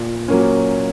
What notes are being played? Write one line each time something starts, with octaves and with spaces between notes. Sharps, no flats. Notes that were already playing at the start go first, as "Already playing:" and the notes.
Already playing: A#2
F#3 A#3 C#4